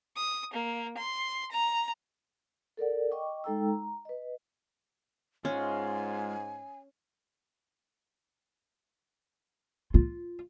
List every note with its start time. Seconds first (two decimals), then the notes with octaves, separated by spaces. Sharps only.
0.16 D#6
0.53 A#3
0.97 C6
1.51 A#5
2.77 A4 A#4 D5 F#5
3.11 D#5 G5 C#6 D6
3.44 G#3 D#4 A4 G5 A#5 E6
3.68 A#5
4.05 B4 D#5
5.45 G#2 G#3 C#4 F4 G#5
9.94 F4